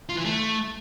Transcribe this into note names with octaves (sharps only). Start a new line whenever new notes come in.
F4
E3
A3